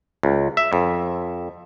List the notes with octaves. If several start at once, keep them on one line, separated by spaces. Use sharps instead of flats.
C#2
E5
F2